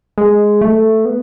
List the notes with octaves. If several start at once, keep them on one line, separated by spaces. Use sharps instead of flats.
G#3
A3
B3